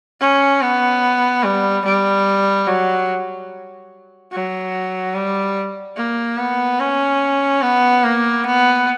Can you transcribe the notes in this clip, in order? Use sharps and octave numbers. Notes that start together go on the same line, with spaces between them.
C#4
B3
G3
G3
F#3
F#3
G3
A#3
B3
C#4
B3
A#3
B3